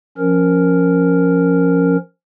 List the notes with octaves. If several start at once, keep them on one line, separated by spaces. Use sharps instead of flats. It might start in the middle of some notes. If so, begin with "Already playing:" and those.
F3 C#4 A#4